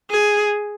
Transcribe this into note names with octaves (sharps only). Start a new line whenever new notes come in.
G#4